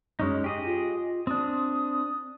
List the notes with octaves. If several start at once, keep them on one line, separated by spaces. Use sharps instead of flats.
F#2 G#3 C#4 D#4
G4 G#4 D#5
F4
C4 D4 D#6